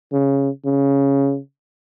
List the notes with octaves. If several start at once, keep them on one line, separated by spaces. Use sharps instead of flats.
C#3
C#3